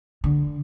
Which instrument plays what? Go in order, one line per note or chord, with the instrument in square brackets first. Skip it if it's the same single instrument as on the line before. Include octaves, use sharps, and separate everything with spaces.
[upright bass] D3